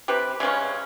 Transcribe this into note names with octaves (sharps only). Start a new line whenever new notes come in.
C3 G4 B4
C#3 G3 G#3 C#4